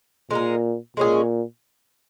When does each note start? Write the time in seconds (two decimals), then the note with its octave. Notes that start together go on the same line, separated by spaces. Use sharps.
0.31 A#2 G#3 D#4 A#4
0.97 A#2 G#3 C#4 G#4